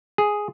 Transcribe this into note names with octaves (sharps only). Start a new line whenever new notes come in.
G#4